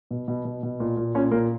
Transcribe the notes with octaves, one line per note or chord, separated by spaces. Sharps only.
B2
B2
B2
B2
A#2
A#2
A#2 C#4
A#2 A#3